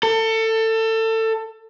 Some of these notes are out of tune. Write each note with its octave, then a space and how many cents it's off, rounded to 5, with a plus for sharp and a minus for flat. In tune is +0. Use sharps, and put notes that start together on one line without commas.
A4 +25